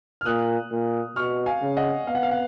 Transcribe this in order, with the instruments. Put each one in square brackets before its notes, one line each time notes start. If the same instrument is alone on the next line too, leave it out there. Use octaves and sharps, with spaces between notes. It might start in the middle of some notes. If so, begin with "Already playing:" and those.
[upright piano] F6
[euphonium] A#2 [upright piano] D#6 F#6
[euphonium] A#2
[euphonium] B2 [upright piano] C#6 F6
[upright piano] F5 G#5
[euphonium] C#3
[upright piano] D#5 F#5
[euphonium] B3 [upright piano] F5
[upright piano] F#5
F5
F#5